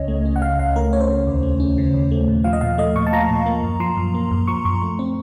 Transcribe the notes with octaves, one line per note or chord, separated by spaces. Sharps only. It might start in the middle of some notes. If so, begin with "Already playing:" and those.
Already playing: C#2 C#3 C#4 C#5 D#5
A3
C#4
F#5
C#3 F5
C#2 F5
A3 A#4
C#4 C#5
C5
C#3
D#2
A3
C#4
C#3
D#2
A3
A#2
F3 F5
D#5
A#2 F5
A3 D#5
A#2 C#6
A5
F3 A#5
A#2
A#3
F#2
F3 C6
F#2
A#3
F#2
F3 C#6
F#2 C#6
A3
C4